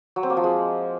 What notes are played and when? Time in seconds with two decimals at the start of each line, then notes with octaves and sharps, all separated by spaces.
0.16 F#3
0.23 C4
0.30 A#3
0.37 F3
0.44 G#3